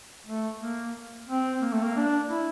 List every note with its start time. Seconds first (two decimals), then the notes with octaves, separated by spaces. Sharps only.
0.26 A3
0.60 A#3
1.28 C4
1.62 A#3
1.72 A3
1.83 A#3
1.97 D4
2.30 E4